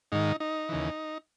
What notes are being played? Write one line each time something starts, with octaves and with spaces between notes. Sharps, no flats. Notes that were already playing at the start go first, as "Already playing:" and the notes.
G#2 D#3 D#4
D#4
D#2 C#3 E3